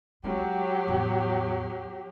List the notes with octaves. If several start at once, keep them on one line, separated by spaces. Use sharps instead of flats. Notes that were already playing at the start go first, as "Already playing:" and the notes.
F#3 G#3 G4
E2 A2